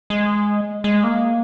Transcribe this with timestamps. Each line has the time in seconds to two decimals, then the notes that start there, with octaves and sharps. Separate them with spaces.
0.10 G#3
0.84 G#3
1.04 A#3